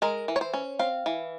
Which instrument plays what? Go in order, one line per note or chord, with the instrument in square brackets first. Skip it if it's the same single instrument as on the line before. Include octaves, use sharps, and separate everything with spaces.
[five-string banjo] G#3 A#4
E3
C#5
C5
C#4
C4 F5
E3